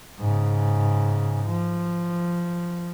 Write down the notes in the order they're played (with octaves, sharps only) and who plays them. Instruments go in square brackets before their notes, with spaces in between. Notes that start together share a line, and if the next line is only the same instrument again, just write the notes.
[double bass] G#2 C#3
F3